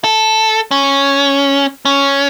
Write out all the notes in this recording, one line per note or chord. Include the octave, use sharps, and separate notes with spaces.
A4
C#4
C#4